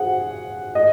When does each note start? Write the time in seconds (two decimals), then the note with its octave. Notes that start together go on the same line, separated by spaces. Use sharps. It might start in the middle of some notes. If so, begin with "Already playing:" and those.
Already playing: G#4 F#5
0.75 D#5